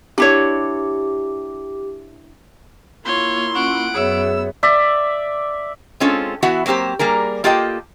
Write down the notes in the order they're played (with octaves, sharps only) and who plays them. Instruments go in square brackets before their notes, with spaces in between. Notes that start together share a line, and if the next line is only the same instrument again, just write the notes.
[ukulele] D4 E4 C#5 [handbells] G4
[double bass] A#3 E4 [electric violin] F4 C#5 [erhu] C6
[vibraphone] C#4 F4 C#6 [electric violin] F#5 D7
[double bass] F#2 B3 [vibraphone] G#4 C#5 E5 [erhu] E6
[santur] D5 E5
[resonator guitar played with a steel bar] G#3 C4 C#4 F4 A4
E3 B3 E4 F#4 E5 F#5
F#3 A#3 C4 G4 C5
G3 A#3 G#4 A#4
A#3 F4 G4 A4 D#5 G5